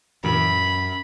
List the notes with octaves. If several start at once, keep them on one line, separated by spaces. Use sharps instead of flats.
F#2 A#2 E3 B5